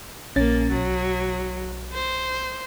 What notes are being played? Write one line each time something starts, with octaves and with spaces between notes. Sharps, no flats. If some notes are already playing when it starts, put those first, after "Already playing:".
A#1 A#3 C#4 A6
B1 F#3
C5